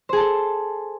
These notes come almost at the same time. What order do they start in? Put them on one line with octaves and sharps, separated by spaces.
C5 G#4 A5 A4